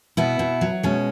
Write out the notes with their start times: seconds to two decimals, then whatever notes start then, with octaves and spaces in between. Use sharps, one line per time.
0.17 B2 B3 E4
0.39 B2
0.61 F#3
0.83 B2 G#3 C#4